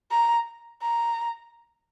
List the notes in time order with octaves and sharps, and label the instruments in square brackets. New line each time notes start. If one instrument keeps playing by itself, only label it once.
[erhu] A#5
A#5